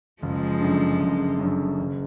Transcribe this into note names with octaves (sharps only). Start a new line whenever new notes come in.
F#1 F3 G#3
F#2 D3
F#1
F#2 D3
F#1